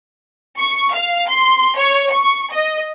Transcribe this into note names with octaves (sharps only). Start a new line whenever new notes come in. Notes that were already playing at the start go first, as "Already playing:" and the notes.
C#6
F5
C6
C#5
C#6
D#5